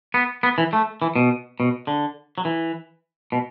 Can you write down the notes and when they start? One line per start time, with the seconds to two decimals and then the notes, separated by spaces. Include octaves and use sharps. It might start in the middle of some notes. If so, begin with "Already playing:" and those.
0.14 B3
0.43 B3
0.58 E3
0.73 A3
1.02 E3
1.16 B2
1.60 B2
1.87 D3
2.38 F#3
2.45 E3
3.32 B2